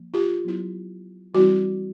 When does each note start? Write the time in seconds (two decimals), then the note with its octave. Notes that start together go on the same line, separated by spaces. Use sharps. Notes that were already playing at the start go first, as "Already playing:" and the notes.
Already playing: F3 A#3
0.14 F4 G4
0.45 F#3 B3 E4
1.34 E3 G3 C4 E4 F#4